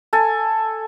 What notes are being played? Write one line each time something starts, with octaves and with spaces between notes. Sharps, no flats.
A4 G#5